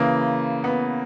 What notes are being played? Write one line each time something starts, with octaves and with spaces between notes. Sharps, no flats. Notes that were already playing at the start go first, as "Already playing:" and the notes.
Already playing: C#3 E3 A#3
B3